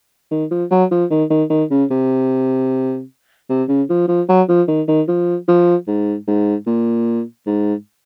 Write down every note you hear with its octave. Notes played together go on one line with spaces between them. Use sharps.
D#3
F3
F#3
F3
D#3
D#3
D#3
C#3
C3
C3
C#3
F3
F3
F#3
F3
D#3
D#3
F3
F3
G#2
G#2
A#2
G#2